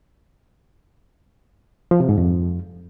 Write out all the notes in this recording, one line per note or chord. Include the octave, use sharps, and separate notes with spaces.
F3
C3
G#2
F2